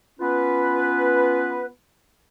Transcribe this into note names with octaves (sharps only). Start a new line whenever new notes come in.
B3 C#4 F4 B4